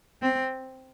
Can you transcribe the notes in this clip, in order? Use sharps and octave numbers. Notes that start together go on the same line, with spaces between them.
C4